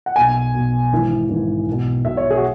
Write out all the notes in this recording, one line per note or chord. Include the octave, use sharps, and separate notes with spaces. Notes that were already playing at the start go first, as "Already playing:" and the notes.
F#5
B1 B2 G#5
B1 B2
G#1 G#2 E3
G#1 G#2 E3
B1
B2
B1 B2 E5
C#5
G#4
F#4